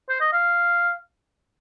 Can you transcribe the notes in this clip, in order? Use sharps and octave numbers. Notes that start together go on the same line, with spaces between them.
C5
D#5
F5